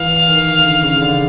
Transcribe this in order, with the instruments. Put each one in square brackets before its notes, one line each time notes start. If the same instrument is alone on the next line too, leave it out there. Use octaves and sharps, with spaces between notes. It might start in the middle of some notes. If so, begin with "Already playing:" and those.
Already playing: [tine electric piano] E3 [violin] F5
[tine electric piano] D#3
D3
C#3
D3